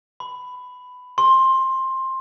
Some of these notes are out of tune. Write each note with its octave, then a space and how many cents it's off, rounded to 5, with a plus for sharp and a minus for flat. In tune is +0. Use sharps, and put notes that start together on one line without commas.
B5 +15
C6 +15